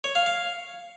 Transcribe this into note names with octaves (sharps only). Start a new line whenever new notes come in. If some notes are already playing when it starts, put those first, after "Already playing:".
C#5
F5
F5